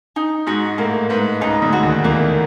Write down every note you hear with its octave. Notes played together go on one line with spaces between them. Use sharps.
D#4
G#2 F#4
A2 A#3
G#2 B4
C#2 C#3 D#4
D2 D3
F#4
D#2 D#3
E2 E3 A#3